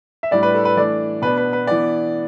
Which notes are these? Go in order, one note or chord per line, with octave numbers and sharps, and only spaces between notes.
E5
A2 G3 D4 D5
B4
A4
B4
E3 A3 D4 D5
B2 B3 D4 B4
B4
B4
E3 B3 D4 D5